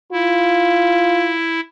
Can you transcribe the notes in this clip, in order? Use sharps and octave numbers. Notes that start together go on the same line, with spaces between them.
E4 F4